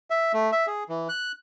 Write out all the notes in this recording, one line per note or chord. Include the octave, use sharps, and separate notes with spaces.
E5
A3
E5
G#4
E3
F#6